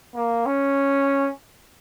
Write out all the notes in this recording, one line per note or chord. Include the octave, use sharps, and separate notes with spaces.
A#3
C#4